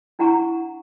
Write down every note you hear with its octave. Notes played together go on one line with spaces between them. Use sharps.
D4 E4 F#5 G#5 A#5 C#6